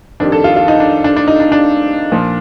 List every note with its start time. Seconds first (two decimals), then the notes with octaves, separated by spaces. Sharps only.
0.20 F2 D#3 G3 D4
0.32 A4
0.44 F4
0.56 F4
0.68 D#4
0.80 D4
1.04 D4
1.17 D4
1.28 D#4
1.40 D4
1.52 D4
2.12 A#2 F3